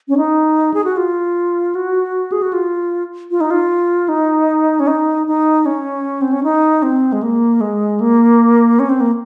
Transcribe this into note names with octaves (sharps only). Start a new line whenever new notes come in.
C#4
D#4
G#4
F#4
F4
F#4
G#4
F#4
F4
F4
D#4
F4
D#4
C#4
D#4
D#4
C#4
C4
C#4
D#4
C4
G#3
A#3
G#3
A#3
C#4
C4
A#3